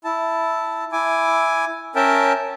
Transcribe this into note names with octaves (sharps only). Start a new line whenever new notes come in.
E4 A5
E4 G#5 D6
C#4 A#4 E5 G5 A5